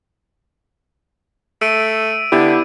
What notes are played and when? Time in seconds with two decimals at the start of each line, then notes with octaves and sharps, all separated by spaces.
1.61 A3 E6 D7 D#7
2.32 D3 B3 E4 G4